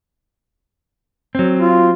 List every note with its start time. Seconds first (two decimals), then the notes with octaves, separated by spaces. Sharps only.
1.35 F#3 C4
1.60 F4